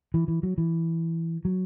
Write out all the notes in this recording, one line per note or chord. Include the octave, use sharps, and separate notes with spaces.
E3
E3
F#3
E3
F#3